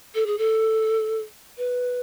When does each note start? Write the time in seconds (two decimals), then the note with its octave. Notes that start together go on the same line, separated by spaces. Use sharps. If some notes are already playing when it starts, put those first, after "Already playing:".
0.15 A4
0.26 G#4
0.38 A4
1.57 B4